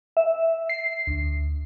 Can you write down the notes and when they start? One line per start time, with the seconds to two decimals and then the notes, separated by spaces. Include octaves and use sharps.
0.17 E5
0.69 C7
1.07 D2